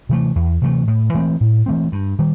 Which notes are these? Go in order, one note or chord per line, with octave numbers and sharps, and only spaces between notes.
C3 E3 A3
E2
C3 E3 A3
A2
E3 A3 C4
A2
E3 A3 C4
G2
D#3 G3